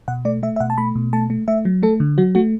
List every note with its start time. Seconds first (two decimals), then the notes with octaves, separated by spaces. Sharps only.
0.08 B2 F#5
0.25 A3 D5
0.43 A3 E5
0.56 E5
0.60 B2 F#5
0.70 A5
0.78 A3 B5
0.96 B2
1.13 A3 A5
1.30 A3
1.48 A3 E5
1.65 F#3
1.83 A3 A4
2.00 D3
2.18 F#3 F#4
2.35 A3 F#4